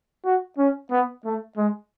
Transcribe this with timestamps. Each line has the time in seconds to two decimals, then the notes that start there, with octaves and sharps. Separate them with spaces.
0.25 F#4
0.58 C#4
0.90 B3
1.25 A3
1.57 G#3